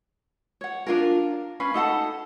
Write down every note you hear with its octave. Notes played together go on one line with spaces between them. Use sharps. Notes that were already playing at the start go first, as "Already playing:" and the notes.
C#5 F#5
D4 F4 A#4
C#4 B4 F5 B5
D#4 A4 F#5 A5